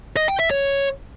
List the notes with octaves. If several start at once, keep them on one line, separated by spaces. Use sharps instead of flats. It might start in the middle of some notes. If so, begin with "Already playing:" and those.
D#5
G5
E5
C#5